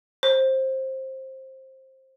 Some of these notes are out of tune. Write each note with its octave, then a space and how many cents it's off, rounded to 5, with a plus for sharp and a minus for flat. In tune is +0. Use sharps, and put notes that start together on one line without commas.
C5 +15